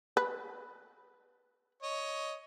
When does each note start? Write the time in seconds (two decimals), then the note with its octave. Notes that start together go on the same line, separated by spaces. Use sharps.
0.17 B4
1.83 C#5 D#5